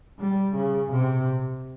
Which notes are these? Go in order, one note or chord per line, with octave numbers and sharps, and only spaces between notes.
G3
C#3
C3